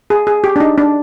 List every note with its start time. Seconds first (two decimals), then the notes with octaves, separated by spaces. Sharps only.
0.10 G#4
0.27 G#4
0.44 G4
0.56 D4
0.60 D#4
0.78 D4